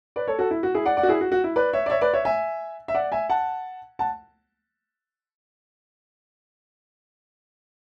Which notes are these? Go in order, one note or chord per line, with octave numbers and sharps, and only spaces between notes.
B4 D5
A4 C#5
F#4 A4
E4
F#4
E4 G#4
D5 F#5
D5 F#5
F#4
E4 G#4
F#4
F#4
E4
B4 D5
C#5 E5
D5
C#5 E5
B4 D5
C#5 E5
E5 G#5
E5
D5 F#5
E5 G#5
F#5 A5
F#5 A5